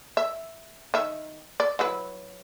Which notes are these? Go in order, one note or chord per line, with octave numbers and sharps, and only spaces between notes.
E5
D#3 E5
D5
F#3 E4 B4